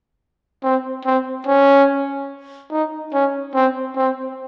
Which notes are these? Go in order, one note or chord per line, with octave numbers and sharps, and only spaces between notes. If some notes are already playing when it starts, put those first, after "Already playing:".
C4
C4
C#4
D#4
C#4
C4
C4